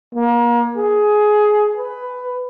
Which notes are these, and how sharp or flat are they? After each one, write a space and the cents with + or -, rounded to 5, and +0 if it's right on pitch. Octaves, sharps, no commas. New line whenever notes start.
A#3 +35
G#4 +15
B4 +15